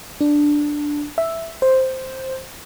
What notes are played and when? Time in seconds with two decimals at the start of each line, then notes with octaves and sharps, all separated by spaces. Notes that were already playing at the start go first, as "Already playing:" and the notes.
0.21 D4
1.18 E5
1.62 C5